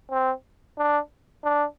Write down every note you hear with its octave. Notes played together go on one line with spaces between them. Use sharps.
C4
D4
D4